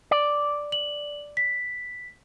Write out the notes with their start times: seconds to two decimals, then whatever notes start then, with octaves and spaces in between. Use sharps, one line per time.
0.11 D5
0.72 F#7
1.37 B6